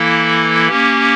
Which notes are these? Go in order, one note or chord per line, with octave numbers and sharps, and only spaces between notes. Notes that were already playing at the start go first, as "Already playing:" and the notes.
Already playing: E3 A#3 E4 A4
A#3 C#4 G4